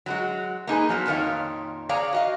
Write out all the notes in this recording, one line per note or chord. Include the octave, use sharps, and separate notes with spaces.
F#3 G#3 F#4
A#3 D#4 G#4 B4
F3 F#3 B3
F2 A#2 D#3 C#5 F5
G#4 C#5 D5 F5 A#5
F#4 D#5 F5